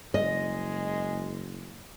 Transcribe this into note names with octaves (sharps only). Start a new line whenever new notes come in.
F#1 G#3 D#5